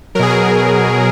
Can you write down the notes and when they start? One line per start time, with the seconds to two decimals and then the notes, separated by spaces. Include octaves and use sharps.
0.15 F#3 A#4
0.19 B2 G#4
0.30 A#4